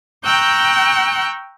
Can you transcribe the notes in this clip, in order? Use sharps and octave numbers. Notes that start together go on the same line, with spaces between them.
G5 A#5 C#6 E6 F#6 G6